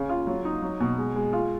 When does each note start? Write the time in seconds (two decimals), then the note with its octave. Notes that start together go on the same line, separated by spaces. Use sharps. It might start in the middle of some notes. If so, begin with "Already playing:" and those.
Already playing: C#3
0.09 F4
0.27 F#3
0.45 D#4
0.62 F#3
0.80 B2
0.98 G#3
1.15 G#3
1.33 F4